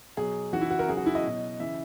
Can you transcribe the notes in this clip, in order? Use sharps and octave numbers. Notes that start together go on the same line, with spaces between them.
B2 F#3 G#4
C#3 E3 F#4
E4
F#4
A#4
C#3 F#3 G#4
F#4
E4
D#5
B2 F#3
C#3 E3 E5